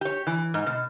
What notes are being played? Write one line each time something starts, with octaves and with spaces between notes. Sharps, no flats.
G4 C#5
E3
G#2
B2